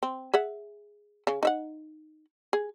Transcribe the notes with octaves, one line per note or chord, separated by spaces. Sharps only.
C4
G#4 E5 F#5
C#3
D#4 E5 F#5
G#4